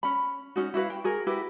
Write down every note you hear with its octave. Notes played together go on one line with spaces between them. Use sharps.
C#4 B5
C#4 D#4 F#4
E4 F#4 B4 F5
G5
F#4 G#4 A#4
E4 F#4 G4 B4